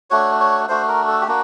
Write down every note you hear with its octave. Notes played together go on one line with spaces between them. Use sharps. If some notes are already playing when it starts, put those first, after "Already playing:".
A3 D4 F#4 C#5
C#5
A3 D4 F#4 C5
A#4
A4
G4
A#3 D4 F#4